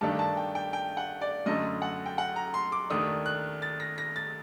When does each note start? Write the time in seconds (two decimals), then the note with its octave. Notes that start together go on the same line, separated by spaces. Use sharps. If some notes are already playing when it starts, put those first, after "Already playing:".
0.01 G2 D#3 A3 D4 A5
0.19 A5
0.37 G5
0.55 G5
0.73 G5
0.97 F#5
1.21 D5
1.46 F#2 D3 A3 D#5
1.82 F#5
2.06 G5
2.18 F#5
2.36 A#5
2.54 C6
2.72 D6
2.90 D#2 D#3 A3 D4 D#6
3.26 F#6
3.62 A6
3.80 A#6
3.98 A#6
4.16 A6